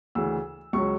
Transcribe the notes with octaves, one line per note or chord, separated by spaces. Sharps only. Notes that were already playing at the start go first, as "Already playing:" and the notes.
D2 C#3 E3 E6
C#2 C#3 F#3 C#6